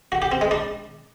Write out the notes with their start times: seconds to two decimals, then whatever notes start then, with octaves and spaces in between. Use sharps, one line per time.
0.12 F#4
0.22 G4
0.32 C4
0.41 G#3
0.51 D4